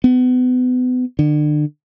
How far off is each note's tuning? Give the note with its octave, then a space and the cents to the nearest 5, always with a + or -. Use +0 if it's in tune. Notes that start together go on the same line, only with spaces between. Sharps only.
B3 +30
D3 +35